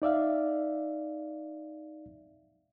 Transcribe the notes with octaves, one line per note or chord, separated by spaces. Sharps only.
D#4 D5 E5 F5